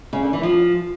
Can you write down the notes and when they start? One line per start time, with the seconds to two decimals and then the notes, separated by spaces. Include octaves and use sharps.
0.13 C#3
0.23 D3
0.33 E3
0.43 F3